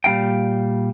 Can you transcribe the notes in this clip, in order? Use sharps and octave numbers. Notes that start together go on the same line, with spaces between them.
A#2 G3 E4 F5 G5